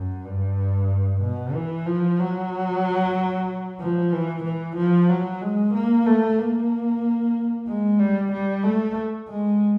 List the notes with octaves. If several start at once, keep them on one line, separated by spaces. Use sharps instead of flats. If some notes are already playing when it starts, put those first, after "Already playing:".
Already playing: F#2
G2
B2
E3
F3
F#3
F3
E3
E3
F3
F#3
G#3
A#3
A3
A#3
G#3
G3
G3
A3
G#3